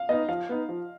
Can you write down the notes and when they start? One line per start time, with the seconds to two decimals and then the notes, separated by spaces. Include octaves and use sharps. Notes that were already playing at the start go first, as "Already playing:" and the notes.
Already playing: F5
0.09 B3 D#4 D#5
0.29 F3 F5
0.49 B3 D#4
0.69 F3